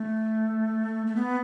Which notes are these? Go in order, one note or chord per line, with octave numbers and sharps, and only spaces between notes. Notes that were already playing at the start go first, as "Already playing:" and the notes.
Already playing: A3
A3
B3